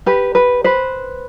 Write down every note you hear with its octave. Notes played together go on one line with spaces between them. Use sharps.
G4 B4
B4
B4 C5